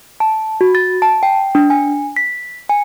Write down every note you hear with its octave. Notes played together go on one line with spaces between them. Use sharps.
A5
F#4
A6
A5
G5
D4
G#5
B6
G#5